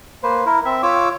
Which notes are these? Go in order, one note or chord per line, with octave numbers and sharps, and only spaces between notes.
A#3 B4 C5
E4 A#4
C4 E5
F4 C#5 D6 E6